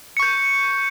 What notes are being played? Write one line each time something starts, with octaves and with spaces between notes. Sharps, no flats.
C#6 G6 C#7